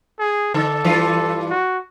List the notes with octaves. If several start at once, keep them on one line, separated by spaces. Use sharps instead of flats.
G#4
D3 A4
G2 E3 F4
F#4